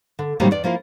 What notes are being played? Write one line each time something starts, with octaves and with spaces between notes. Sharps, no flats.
D3
A2 C3 D#3 F#3 G3 A#3
E2 D5
F3 A#3 E4 F4